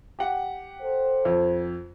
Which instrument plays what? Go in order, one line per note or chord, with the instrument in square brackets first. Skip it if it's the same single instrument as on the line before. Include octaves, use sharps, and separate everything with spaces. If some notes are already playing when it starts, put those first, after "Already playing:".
[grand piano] G4 F#5
[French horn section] A4 C5
[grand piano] F2